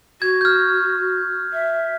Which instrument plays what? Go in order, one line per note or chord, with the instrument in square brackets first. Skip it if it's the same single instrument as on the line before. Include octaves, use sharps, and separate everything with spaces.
[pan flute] F#4 [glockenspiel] G#6
[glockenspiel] F6 G6
[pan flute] E5